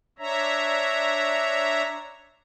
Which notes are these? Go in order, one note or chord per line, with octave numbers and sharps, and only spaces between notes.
D4 C#5 E5 A#5